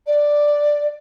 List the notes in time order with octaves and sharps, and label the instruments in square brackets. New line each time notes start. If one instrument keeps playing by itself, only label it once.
[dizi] D5